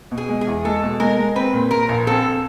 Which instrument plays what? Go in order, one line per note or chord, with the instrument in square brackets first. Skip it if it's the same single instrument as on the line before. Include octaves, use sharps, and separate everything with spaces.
[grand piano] B2
[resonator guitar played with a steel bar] G#4
[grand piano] G#3
[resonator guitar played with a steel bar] G#4
[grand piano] E2
[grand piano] G#3 [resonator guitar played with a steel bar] A4
[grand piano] B2
[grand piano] G#3 [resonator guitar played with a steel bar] A#4
[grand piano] G#3
[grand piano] C4 [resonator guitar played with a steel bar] B4
[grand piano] A#2
[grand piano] A#2 [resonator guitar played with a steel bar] A#4
[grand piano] A#1
[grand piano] C4 [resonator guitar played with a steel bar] A4